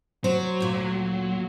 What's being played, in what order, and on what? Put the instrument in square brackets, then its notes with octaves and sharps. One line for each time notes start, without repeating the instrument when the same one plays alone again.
[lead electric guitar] F#3 [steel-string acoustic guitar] C5
[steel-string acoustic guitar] D2 A#2